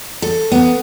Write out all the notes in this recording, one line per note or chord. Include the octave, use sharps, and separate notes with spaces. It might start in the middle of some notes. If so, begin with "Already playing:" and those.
A4
B3